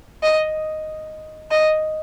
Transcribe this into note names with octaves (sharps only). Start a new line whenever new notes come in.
D#5
D#5